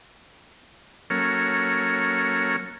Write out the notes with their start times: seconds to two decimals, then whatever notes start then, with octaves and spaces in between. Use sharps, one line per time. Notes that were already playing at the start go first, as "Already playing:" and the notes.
1.10 F#3 A#3 C#4 A4 A#4 C#5